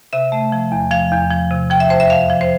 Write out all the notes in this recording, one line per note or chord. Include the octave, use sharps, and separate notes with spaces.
C3 E5
A3
F3
E2
F3 F5
E2
F3
C3
F3 G5
E5
F2 C5
E5
F2 F5
F3
C5